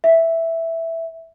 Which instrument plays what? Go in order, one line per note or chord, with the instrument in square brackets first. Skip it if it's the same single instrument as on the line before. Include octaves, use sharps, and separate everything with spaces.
[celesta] E5